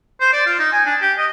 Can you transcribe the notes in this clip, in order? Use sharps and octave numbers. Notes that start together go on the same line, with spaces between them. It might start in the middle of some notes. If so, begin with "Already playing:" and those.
C5
D5
F4
D#4
G#5
D4
G4
D#5